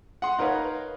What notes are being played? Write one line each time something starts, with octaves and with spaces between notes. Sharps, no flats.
F#5 C6
D#4 A#4 B4 C#5 F5